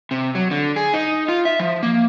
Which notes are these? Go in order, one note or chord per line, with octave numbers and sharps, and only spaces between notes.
C3
F#3
D3
G#4
D#4
F4
E5
F3
A#3